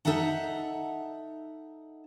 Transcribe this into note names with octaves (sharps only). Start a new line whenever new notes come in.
D#4 A4 E5 F#5 A#5